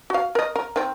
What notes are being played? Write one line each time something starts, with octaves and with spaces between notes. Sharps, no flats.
F#4 F5
A#4 D#5
A#4
D#3 C4